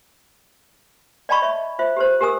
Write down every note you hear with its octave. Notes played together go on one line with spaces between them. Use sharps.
D5 D#5 G5 A5 B5 C#6
C#5 E5 B5 C#6
F4 C5 E5
G4 B4 C5
G4 A#4 G#5 D#6 E6